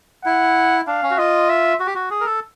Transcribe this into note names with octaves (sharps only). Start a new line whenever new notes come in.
E4 F#5
D4 F5
C#4
F#4
F4 D#5
E5
F#4
G4
F#4
G#4
A#4
A4